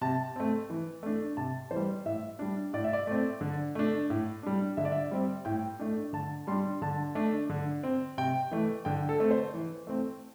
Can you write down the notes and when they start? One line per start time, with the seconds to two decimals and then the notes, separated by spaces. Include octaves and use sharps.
0.01 C3 A5
0.36 A3 C4
0.70 E3
1.03 A3 D4
1.37 C3 A5
1.71 E3 C5
1.76 G3
2.06 A2 E5
2.39 G3 D4
2.73 A2 D5
2.84 E5
2.93 D5
3.07 A3 C4
3.41 D3
3.75 A3 D4
4.10 A2
4.43 G3 D4
4.77 D3 E5
4.85 D5
4.92 E5
5.11 G3 C4
5.45 A2 G5
5.79 A3 D4
6.13 D3 A5
6.47 G3 D4 C6
6.82 D3 A5
7.15 A3 D4
7.50 D3
7.83 C4
8.18 C3 G5
8.51 E3 A3
8.85 D3 G5
9.09 A4
9.20 A3 C4
9.31 C5
9.54 E3
9.87 A3 C4